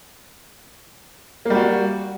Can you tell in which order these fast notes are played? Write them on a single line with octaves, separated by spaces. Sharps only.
A#3 G3 F#4